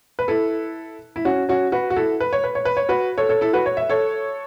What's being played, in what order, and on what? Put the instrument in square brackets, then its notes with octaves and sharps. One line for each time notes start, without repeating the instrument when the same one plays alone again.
[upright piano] B4
E4 A4
E4
C#4 F#4
C#4 F#4
F#4 B4
F#4
E4 A4
B4
C#5
B4
C#5
B4
C#5
F#4 B4
A4 C#5
A4 C#5
E4 A4
F#4 B4
C#5
E5
A4 C#5